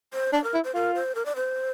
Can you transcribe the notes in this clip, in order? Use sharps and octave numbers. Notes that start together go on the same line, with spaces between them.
C5
D4 D5
A#4
E4
C5
F4 A#4
C5
A#4
D5
C5